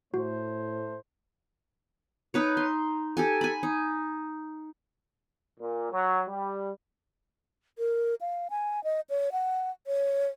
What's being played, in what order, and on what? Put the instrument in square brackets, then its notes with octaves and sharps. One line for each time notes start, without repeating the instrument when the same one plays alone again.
[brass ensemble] A2 A3 C5 [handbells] F#4
[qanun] D#4 B4 C#5
C6
G4 A4 G#5
G#5 B5
D#4
[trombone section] A#2
F#3
G3
[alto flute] A#4
F5
G#5
D#5
C#5
F#5
C#5